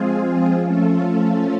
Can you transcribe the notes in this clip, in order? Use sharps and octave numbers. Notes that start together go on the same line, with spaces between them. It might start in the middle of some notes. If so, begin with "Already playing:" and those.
Already playing: F3 G#3 C4 F4 G#4
F3 A3 C#4 F4 A4